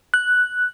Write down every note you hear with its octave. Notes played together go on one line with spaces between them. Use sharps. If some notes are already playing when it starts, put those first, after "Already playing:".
F#6